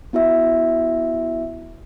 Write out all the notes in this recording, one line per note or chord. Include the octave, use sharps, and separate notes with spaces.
B3 E4 F#4 E5